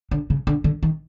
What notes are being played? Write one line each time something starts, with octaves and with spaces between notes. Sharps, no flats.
D3
C#3
D3
D3
D#3